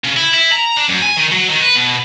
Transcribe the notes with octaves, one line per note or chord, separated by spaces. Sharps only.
C#3
E4
E4
A#5
D4
F#2
G#5
D#3
F#3
D#3
B4
B2